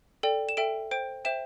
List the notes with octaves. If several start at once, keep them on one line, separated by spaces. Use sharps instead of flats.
A4 D5 G5
E7
A4 E5 G5 D7
C5 G5 D7
C5 E5 G5 E7